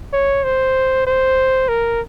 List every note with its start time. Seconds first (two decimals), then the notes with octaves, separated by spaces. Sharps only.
0.13 C#5
0.44 C5
1.06 C5
1.68 A#4